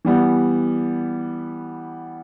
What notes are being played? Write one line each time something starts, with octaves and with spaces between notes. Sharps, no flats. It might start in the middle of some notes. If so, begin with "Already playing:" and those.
E3 G3 B3